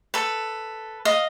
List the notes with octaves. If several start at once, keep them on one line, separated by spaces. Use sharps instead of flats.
A4 B4
D#5 F5